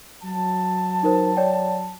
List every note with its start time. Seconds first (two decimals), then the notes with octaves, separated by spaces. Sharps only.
0.24 F#3 A5
1.03 D#4 A#4 C5
1.37 C#5 D5 G5